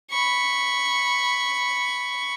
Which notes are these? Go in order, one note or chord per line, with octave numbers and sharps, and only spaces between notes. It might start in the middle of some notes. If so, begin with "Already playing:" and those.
B5 C#6